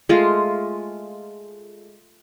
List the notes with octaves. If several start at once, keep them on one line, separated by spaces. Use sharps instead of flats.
G#3 A3 F4